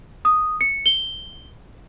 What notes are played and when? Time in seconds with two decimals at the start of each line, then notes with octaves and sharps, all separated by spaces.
0.25 D#6
0.61 C#7
0.86 G7